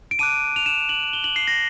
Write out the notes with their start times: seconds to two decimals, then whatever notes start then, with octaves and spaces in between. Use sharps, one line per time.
0.11 D7
0.19 A5 D6 F#6 D#7
0.56 F7
0.66 E7
0.89 F#7
1.13 G7
1.24 F#7
1.36 C7
1.47 A#6